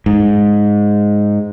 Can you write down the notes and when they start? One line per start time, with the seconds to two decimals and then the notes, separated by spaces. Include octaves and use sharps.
0.06 G#2